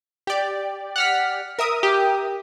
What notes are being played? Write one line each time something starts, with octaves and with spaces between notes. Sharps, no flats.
G4 D5
F#5 F6 B6
A#4 E5 D#6
G4